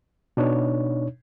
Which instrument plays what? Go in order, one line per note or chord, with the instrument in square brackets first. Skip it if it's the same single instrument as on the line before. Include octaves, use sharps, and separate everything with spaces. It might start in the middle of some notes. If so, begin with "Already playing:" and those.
[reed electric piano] B2 D4 D#4 C#5